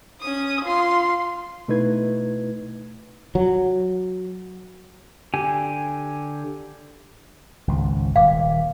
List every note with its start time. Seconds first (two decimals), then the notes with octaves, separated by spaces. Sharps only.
0.21 C#4 D#6
0.64 F4 C6
1.68 B2 A3 D#4 E4 B4 G#6
3.35 F#3
5.34 D3 G4 G#5
7.67 G#1 C#2
8.16 D#1 F5 D6